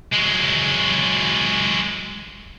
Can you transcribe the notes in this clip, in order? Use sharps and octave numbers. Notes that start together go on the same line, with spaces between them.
F#3 G#3